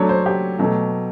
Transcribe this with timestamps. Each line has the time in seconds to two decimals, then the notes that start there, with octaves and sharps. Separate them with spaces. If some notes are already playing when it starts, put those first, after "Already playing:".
Already playing: F#3 A3 D4 C#5
0.09 C5
0.26 G4
0.59 B2 F#3 A3